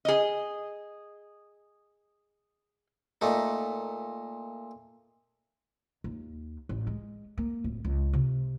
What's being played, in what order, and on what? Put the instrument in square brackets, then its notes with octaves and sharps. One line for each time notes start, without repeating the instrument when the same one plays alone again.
[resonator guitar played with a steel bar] G#4 D#5
[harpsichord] A#2 A3 D#4
[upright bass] D#2
A1
G#3
A#3
D1
C#2
C3